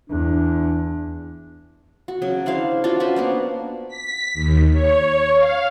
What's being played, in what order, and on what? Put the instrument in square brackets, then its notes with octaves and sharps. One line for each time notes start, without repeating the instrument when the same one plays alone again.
[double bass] E2 [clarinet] D4
[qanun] F#4
C#3 F#3
D4 E4 C5 F5
D4 F4 F#4
C#4 F#4 B4 C5
A#3 B3 D4
[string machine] B6
D#2
C#5
F5